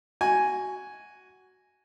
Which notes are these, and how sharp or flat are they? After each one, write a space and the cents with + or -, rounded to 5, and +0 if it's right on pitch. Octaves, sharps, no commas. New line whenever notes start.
F#4 +10 G#5 +0